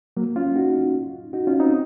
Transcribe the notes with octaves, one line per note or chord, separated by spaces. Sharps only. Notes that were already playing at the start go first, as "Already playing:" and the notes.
F#3 A#3
C#4 F4
D#4 F#4
D#4 F#4
C#4 F4
C4 D#4